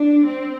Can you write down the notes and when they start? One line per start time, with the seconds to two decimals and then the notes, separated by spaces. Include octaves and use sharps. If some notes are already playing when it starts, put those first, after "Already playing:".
Already playing: D4
0.26 C4